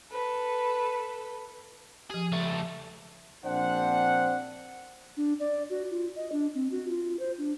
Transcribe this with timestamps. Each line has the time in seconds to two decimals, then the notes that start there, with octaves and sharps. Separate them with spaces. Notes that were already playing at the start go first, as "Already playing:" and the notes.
0.10 A4 B4
2.10 F3 G4 G#4
2.32 C#2 A3
3.45 A#1 C4 D4 C5 F#5
5.17 D4
5.40 D5
5.70 F#4
5.91 F4
6.16 D#5
6.32 D4
6.55 C4
6.71 F#4
6.88 F4
7.19 C5
7.38 D4